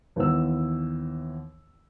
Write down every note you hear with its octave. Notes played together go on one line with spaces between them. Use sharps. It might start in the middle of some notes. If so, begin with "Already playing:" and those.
D#2 E3 B3 E6